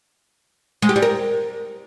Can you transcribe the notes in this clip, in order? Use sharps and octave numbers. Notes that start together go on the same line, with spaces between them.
G#3
G4
G3
A#4